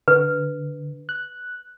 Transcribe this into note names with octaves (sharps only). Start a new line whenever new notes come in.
D3 B4
F#6